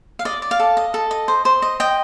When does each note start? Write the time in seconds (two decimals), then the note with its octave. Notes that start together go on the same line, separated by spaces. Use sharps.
0.19 F5
0.25 D5 D#5
0.42 D5
0.51 F5
0.59 A4
0.77 D#5
0.94 A4
1.11 D#5
1.28 C5
1.45 C5
1.62 D#5
1.80 D#5 G5